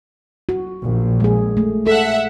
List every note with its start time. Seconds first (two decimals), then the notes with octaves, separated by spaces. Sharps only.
0.49 F#4
0.82 A#1
1.20 G#3 G#4
1.57 A3
1.87 A4 E5 F#5